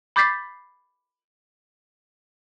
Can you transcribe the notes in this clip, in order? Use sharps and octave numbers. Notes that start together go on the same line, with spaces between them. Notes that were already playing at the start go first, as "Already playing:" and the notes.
B5 D6 G6 A6 B6 C7